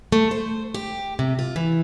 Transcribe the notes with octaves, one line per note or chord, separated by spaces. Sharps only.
A3
C5
G4
C3
F4
E3